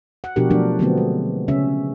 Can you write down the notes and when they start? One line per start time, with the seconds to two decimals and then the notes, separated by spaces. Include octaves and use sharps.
0.24 F#5
0.36 B2 F3 D4 F#4 G4 A#4
0.50 F3 F#3 A3 D4 A#4
0.79 D3 F3 F#3 A3 B3 C4
0.97 G#3
1.48 C#3 C#4 E5